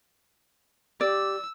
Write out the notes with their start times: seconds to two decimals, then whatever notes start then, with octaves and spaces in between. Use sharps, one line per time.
1.01 G4 D5 E6